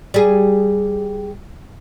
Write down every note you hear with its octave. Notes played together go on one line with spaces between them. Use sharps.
G3 G#4